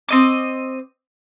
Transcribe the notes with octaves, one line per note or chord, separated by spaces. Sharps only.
C4 D#5 D6